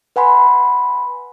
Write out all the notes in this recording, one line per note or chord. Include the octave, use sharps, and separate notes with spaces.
B4 F#5 G#5 B5 C6